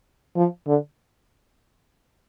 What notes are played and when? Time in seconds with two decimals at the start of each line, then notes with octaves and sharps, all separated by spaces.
0.36 F3
0.67 D3